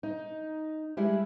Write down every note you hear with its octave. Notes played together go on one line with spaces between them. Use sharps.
D#4
G3 G#3 E4